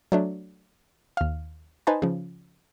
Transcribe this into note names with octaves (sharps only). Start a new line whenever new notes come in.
F#3 A3 D4
D#2 F5
D#4 B4 C5 G#5 A5
C#3 F3